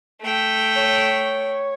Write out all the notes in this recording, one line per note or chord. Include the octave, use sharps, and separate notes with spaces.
A3 G5
C#5